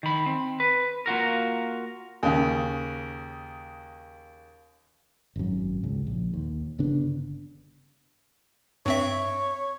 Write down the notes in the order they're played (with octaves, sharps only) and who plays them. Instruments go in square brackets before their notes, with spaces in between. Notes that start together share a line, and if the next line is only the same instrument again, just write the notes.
[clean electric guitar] D#3 B5
C4
B4
A#3 F4 F#4 A#4
[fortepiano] D#2 C#3
[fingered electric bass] G#1 F#2
G#1 C#2
A#1
D#2
G1 C#3 B3 D4
[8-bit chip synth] G2 C4 E5 [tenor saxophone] C#5